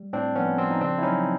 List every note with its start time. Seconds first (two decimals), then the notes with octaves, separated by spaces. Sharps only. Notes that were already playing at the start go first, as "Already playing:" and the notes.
Already playing: G3
0.13 A2 C4 D4
0.36 F3 B3 C#4
0.58 F3 C4
0.71 D#4
0.81 C#3 C4 D4
0.98 E4
1.03 F#3 C#4 D#4